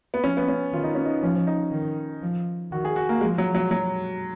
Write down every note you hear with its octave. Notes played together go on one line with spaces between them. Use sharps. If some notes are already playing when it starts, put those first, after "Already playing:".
B3
F3 C#4
B3
C#4
D#3 F4
D#4
C#4
D#4
F3 C#4
D#4
D#3
F3
D#3 F#4
G#4
F#4
A#3
F3 G#3
F#3
F#3
F#3